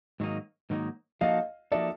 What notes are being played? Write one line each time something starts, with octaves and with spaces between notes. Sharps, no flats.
G#2 D#3 F#3 A#3 D#4
G#2 D#3 F#3 A#3 D#4
F3 A#3 D#4 F#4 A4 D#5 F5
F3 A#3 D#4 F#4 A4 D5 E5